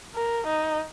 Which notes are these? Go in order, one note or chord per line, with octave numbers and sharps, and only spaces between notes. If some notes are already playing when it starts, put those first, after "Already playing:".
A#4
D#4